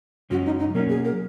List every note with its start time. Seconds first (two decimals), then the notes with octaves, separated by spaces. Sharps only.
0.30 F#2 C#3 G#3 C#4 F#4
0.46 D#4
0.60 D#4
0.74 B2 F#3 A#3 C#4 A#4
0.89 G#4
1.05 A#4